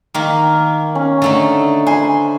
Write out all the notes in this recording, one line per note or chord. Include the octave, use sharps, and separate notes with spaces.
D#3 A#3
C#4
D3 A3 D#4
C5 G#5 B5